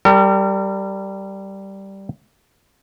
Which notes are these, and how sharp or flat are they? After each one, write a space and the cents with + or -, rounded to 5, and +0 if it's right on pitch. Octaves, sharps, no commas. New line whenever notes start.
G3 -5 A#4 -45